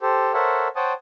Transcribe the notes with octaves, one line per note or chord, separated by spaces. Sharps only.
G4 A4 C5
A4 A#4 C5 C#5 E5 F#5
C5 C#5 F#5 G5 A5 D#6